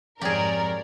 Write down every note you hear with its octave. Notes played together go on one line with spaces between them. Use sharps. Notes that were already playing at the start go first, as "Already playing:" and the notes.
F2 G#2 G4 G#4 A#4 C#5 D5